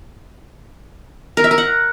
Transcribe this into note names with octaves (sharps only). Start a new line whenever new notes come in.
A#4
E5
A#4
F#5